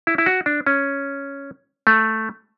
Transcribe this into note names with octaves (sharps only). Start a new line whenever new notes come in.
E4
E4
F#4
D4
C#4
A3